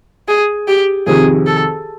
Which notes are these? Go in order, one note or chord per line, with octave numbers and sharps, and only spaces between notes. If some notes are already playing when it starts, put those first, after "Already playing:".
G#4
G4
F2 C3 D#3 G#4
A4